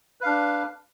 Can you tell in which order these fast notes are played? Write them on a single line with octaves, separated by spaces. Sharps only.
B4 F5 D4